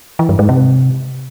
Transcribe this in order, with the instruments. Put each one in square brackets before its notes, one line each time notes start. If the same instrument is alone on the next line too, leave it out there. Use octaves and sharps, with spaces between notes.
[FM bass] E3
G2
G#2
C3